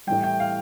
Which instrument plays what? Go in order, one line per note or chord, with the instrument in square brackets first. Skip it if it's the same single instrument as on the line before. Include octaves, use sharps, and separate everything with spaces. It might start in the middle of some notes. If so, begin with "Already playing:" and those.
[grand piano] A2 E3 G3 G5
G5
F5